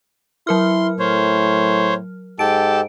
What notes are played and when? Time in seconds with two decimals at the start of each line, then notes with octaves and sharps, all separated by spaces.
0.47 F#3 E4 A#4 C6 F6
0.99 A2 C5 C#5
2.39 G#2 G4 A4 A5 D7